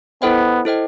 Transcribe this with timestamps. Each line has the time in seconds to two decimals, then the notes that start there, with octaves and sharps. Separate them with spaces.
0.22 B3 E4 A4 C5 D#5 G5
0.65 E4 A4 C5 D#5 G5